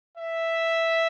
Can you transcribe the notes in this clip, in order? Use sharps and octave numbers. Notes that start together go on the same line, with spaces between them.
E5